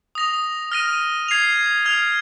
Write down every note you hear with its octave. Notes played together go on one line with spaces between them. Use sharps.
D#6 A#6 F7
F6 A#6 D#7
G#6 C7 F7
F6 G#6 F7